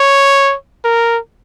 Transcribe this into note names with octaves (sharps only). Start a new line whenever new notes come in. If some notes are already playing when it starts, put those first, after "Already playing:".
Already playing: C#5
A#4